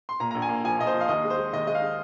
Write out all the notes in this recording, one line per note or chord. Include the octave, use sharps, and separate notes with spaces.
C6
A#2 A#5
A#1 A#5
G#5
A#3
F3 G#5
A#2 D#5
C5
F3
F5
D#2 D#5
G#3
C5
G#3
D#2 D#5
G#3 D#5
F5
G#3